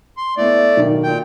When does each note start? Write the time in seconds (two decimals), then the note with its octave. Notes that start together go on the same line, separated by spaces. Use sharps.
0.17 C6
0.37 A2 A3 B3 D5
0.77 B1 D#3
1.03 A#2 G5